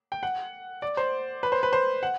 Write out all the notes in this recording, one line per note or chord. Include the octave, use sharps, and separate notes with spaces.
G5
F#5
D5
C5
B4
C5
B4
C5
F#5